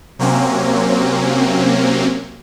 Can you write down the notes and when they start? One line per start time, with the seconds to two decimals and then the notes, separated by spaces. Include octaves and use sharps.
0.19 C3 F#3 A#3 C4 C#4